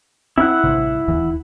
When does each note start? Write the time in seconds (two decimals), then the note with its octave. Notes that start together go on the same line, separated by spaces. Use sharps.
0.38 C4 E4 F#5
0.64 A1 G2 C3
1.08 D1 D#2 E3